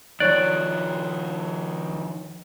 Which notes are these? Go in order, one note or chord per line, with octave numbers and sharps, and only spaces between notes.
D#3 F3 C#5 D5 F#6